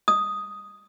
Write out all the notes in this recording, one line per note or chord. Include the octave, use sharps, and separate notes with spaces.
D#6